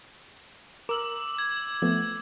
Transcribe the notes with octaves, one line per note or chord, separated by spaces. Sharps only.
A#4 D6 E6 F#7
G#6
F3 A3 B3